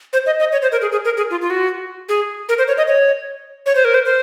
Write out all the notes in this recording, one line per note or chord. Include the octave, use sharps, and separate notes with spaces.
C5
D#5
D#5
C#5
C5
A#4
G#4
G#4
A#4
G#4
F4
F4
F#4
G#4
A#4
C5
C#5
D#5
C#5
C#5
C5
A#4
C5
C5